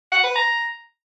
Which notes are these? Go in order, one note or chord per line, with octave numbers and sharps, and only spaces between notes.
F#5
B4
A#5